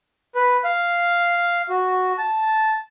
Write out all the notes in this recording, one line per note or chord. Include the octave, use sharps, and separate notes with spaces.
B4
F5
F#4
A5